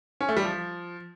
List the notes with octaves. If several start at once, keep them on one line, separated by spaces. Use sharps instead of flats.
C#4
A3
G3
F3